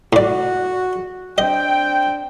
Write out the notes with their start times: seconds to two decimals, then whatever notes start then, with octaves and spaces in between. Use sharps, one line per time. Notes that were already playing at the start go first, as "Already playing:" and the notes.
0.13 A2 F#4 D5
1.38 C4 D4 D#5 G5